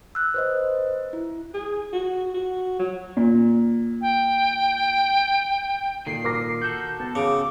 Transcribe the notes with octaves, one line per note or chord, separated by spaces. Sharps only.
E6 F#6
B4 C5 D#5
E4
G#4
F#4
F#4
F#3
A#2
G5
A#2 D#3 A4 C7
A#4 D6 A#6
F#4 A4 G6
B3 A5
C#3 D6